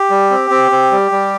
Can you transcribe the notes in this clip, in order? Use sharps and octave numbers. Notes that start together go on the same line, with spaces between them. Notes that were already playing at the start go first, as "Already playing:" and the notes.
Already playing: G4
G3
C4
C4
C4
G3
G3